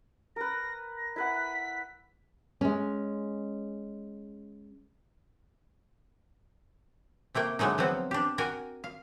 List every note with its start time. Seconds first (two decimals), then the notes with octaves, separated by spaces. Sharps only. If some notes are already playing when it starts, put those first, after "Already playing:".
0.36 A#4 B4 A#6
0.97 A#6
1.16 E4 B4 F#5 B6
2.61 G#3 C#4
7.35 C3 A3 A#3 G5
7.59 D3 F#3 G#3 A3 D#4
7.78 F3 F#3 B3 C4
8.11 D4 G4
8.38 F#4 A#4 G5 G#5
8.84 F5